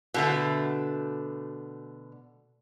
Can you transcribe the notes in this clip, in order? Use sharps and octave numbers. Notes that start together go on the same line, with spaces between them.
B2 D3 A3